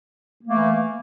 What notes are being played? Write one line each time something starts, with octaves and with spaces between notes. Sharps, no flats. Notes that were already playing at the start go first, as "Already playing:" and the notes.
E3 A3 A#3